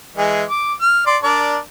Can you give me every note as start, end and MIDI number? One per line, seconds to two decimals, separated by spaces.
0.17 0.44 52
0.17 0.44 56
0.17 0.44 68
0.50 0.73 86
0.81 1.05 89
1.06 1.17 74
1.06 1.17 84
1.23 1.58 62
1.23 1.58 70
1.23 1.58 74